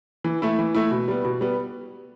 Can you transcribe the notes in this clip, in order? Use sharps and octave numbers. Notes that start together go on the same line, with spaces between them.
E3
A3 E4
E3
A3 E4
B2
G3 B3
B2
G3 B3